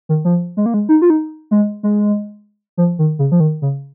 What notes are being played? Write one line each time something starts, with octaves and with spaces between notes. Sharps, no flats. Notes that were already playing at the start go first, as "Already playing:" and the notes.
D#3
F3
G#3
A#3
G#3
D#4
F4
D#4
G#3
G#3
F3
D#3
C#3
F3
D#3
C#3